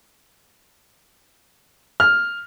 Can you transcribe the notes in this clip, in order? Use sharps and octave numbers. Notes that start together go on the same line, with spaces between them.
F6